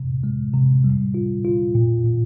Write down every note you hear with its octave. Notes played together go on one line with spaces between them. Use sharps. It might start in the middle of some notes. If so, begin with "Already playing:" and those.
Already playing: C3
G#3
C3
G3
F4
F4
A#2
A#2